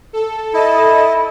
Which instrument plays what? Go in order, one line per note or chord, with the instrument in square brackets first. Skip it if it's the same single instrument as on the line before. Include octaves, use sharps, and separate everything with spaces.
[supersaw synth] A4
[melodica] E4 [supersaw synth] A4 D#5